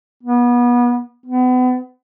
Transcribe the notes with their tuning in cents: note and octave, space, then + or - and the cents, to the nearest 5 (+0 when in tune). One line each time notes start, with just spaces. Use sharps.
B3 -30
B3 +35